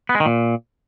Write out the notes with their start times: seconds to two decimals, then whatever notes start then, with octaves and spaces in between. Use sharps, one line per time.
0.09 B3
0.15 G#3
0.20 D#3
0.26 A#2